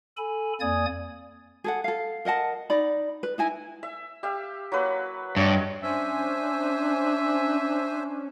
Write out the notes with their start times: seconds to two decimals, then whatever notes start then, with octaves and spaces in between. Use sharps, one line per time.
0.17 A4 G#5 B5
0.60 F2 A#3 D5 G#5 D#6 G#6
1.64 G#4 A4 F#5
1.84 A4 F5
2.25 A#4 D#5 F#5 A5
2.70 D#4 D5 B5
3.23 B4
3.38 D#4 E4 G#5
3.83 E5
4.23 G4 E5 F5
4.72 F#3 A#3 B4
5.36 G2 C#5 D#5
5.83 C#4 D4 C5 E5 G#5